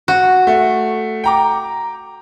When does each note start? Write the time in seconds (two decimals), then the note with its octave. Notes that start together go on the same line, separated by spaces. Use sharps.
0.08 F#4
0.47 A3
1.24 G5 A#5 D6